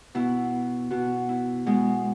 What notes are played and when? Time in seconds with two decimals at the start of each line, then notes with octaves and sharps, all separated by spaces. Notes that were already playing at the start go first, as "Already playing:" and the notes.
0.15 B2 E4
0.91 B2 F#4
1.29 E4
1.66 B2 G#3